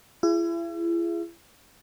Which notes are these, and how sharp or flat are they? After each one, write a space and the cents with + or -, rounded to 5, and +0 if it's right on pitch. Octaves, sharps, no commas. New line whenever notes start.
E4 +40 G#4 +0